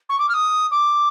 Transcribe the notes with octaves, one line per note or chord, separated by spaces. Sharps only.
C#6
D6
F6
D#6
D6